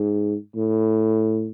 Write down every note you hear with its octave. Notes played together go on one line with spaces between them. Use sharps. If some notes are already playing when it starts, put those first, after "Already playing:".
Already playing: G#2
A2